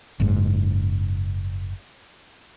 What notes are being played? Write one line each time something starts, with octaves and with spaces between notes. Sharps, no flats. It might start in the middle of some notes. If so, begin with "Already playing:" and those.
F#1 G#2